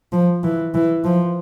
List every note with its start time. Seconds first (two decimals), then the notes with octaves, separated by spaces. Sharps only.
0.13 F3
0.44 E3
0.74 E3
1.04 F3